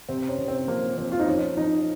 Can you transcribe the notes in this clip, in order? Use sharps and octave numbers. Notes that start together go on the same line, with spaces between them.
C3 C4
C#4
C3
C4
F3 A#3
F3 C4
F4
D#4
F3 C#4
F3 D#4